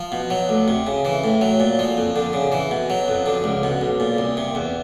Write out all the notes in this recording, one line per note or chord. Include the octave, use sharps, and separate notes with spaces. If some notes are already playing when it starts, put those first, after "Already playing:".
Already playing: F3
B2
F#3
D2
C3
C#3
E3
A2
F#3
A#2
F3
F2
D3
C#3
E3
B2
F#3
F2
D3
C#2
B2
B1
A#2
C2
C3
E2